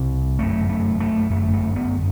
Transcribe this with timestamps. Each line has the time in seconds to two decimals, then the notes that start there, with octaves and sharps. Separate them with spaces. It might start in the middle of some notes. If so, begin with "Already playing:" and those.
Already playing: C2 C3
0.39 G1 F#2 A3
0.69 A3
1.00 A3
1.30 G1 F#2 A3
1.54 A3
1.76 B3